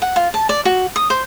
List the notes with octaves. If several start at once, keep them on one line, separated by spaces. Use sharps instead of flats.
F#5
F4
A5
D5
F#4
D#6
C5